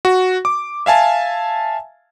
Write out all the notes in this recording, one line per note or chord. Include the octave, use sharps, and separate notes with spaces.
F#4
D6
E5 F5 G#5 A5